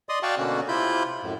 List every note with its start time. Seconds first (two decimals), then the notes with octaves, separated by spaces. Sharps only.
0.09 D5 D#5 C6 D#6
0.23 F#4 D5 F5 G5 A5 C#6
0.38 B2 D3 A#3 C#4 F#4
0.68 C3 E4 F4 B5 G6
1.23 F#2 A2